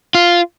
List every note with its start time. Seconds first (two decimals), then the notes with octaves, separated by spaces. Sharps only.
0.15 F4